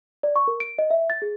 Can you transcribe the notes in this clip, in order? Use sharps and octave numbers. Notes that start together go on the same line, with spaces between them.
D5
C#6
A#4
D7
D#5
E5
A6
G#4